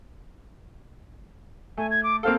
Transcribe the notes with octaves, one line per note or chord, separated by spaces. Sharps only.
A3 G#5
G#6
D6
A#3 C4 A4 F5